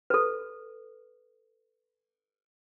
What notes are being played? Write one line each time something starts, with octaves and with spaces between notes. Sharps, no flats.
A4 B4